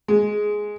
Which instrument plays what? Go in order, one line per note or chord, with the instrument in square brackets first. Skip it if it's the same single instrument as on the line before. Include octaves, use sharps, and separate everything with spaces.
[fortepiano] G#3